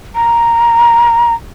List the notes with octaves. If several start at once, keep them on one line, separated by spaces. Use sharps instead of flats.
A#5